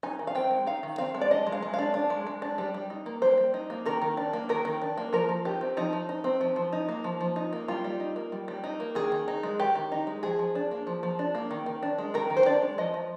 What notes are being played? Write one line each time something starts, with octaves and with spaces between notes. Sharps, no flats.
D#4 G#5
D#3
F5
C4 G5
G#3
D#4 F5
D#3
C4 F5
G#3
D5
D4 D#5
G#3
F5
G#3
D4 F5
D4
G#3
G#3
D4
G3
G3
D#4
A#3
G3 C5
G3
D#4
A#3
D#3 A#4
D#3
D4
A#3
D#3 A#4
D#3
D4
A#3
F3 A#4
F3
D#4 G4
C4
F3 D#4
F3
D#4
C4
F3
F3
D#4
A#3
F3
F3
D#4
A#3
G3 F4
G3
D#4
A#3
G3
G3
D#4
A#3
D#3 G#4
D#3
D#4
G#3
D#3 G4
D#3
D#4
G#3
F3 G#4
F3
D4
A#3
F3
F3
D4
A#3
D#3
D#3
D4
G#3
D#3 A#4
D#3
C5
D4 D5
G#3
F3 D#5
F3